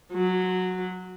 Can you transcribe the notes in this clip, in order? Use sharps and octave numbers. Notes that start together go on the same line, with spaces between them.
F#3